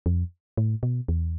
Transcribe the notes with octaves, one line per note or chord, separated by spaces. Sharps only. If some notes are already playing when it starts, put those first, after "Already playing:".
F2
A2
B2
E2